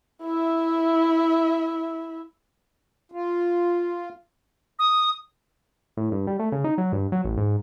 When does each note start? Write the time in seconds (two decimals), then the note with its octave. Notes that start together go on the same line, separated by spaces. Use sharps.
0.23 E4 E5
3.12 F4
4.79 D#6
5.97 A2
6.12 G2
6.27 G3
6.39 A3
6.52 C#3
6.64 D#4
6.78 F#3
6.92 G2
7.12 F#3
7.24 A1
7.37 G#2